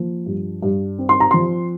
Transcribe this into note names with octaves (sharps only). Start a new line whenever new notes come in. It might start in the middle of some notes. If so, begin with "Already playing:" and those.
Already playing: F3 A#3
G2
G2
C4
C6
A#5
F3 C6